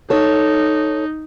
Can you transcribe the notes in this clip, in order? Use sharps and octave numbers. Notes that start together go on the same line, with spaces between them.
D#4 A4 C#5